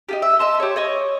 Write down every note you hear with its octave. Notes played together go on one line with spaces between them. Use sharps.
D#4 F4 G4
E5
D#5 E5 A5 C6
G4 C#5
C#5 D#5 C#6